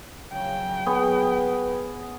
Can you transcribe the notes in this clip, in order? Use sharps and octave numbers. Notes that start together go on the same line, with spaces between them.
C#3 F#3 G5
B3 G#4 B4 C#5